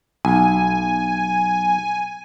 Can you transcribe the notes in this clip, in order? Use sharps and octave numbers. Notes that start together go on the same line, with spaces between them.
B1 G#5